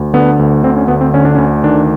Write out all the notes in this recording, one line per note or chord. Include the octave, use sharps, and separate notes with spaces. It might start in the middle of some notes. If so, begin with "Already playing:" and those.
Already playing: D2
D3 B3
D2
D3 C4
C#4
D2 B3
C4
D3 C#4
D4
D2 C#4
D#3 D4